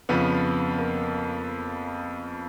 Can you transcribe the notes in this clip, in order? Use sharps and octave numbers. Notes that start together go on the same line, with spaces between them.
F2 C#3 F3 B3
A#3